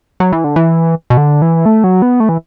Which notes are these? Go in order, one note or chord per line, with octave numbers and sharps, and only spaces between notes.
F#3
E3
D3
E3
B2
D3
E3
A3
F#3
B3
A3
E3